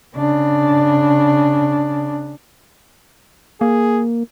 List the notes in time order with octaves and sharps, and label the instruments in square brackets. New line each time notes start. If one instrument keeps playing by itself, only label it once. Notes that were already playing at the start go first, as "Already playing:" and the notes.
[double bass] C#3 D4
[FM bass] A#3 [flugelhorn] G#4